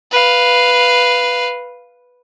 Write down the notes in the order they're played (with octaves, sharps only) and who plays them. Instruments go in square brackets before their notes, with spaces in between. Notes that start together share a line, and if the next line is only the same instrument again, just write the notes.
[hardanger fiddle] B4 F5